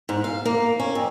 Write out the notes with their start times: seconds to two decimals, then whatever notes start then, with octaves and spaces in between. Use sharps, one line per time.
0.09 G#2
0.24 F5
0.45 A#3
0.80 C#4
0.95 F2